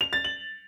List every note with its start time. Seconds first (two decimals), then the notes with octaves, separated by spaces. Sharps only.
0.01 F7
0.13 A6
0.24 F#7